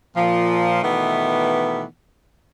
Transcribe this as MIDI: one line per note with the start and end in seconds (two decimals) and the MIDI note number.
0.16 0.81 46
0.16 0.81 53
0.82 1.84 47
0.82 1.84 51
0.82 1.84 52
0.82 1.84 57
0.82 1.84 59